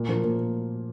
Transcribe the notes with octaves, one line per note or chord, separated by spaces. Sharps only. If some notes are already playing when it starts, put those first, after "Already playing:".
Already playing: A#2
F3 A#3
A#2